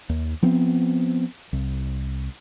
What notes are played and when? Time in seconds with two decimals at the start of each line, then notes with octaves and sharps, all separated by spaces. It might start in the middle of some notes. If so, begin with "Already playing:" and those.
0.09 D#2
0.43 F3 B3 C4
1.53 C2